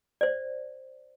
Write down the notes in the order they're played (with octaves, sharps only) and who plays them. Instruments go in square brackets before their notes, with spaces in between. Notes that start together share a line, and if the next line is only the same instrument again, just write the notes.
[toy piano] C5 D5